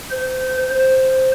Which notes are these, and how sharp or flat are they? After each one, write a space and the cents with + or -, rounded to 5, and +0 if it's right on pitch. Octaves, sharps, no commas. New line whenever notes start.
C5 -25
C5 +0